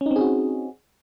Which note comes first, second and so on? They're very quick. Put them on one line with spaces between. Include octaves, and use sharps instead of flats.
C#4 D#4 C4 G#4 F#4